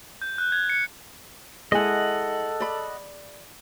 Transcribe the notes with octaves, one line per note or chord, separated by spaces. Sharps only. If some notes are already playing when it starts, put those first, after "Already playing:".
G6
F#6
G#6
C#7
G#3 E4 A4 D#5 F#5 G#5
D5 B5